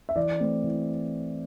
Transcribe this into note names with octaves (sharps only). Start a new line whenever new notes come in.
E5
E3 D5
A3 C4
E3